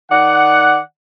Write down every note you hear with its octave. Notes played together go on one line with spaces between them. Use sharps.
D#3 D5 F#5